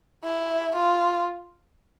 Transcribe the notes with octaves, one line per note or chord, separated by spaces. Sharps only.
E4
F4